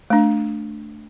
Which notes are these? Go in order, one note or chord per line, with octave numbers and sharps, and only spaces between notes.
A3 D4